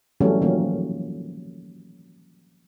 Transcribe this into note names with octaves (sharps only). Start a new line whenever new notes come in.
E3 F#3 G3 A3 C#4
D#3 F3 F#3 A#3 C#4